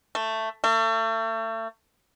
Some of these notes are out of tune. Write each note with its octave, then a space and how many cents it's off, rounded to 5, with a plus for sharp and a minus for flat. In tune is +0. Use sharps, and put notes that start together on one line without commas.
A3 +10
A3 +35